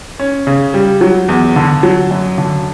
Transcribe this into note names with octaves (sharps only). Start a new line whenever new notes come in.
C#4
C#3
G3
F#3
E2
D3
F#3
F#2
D3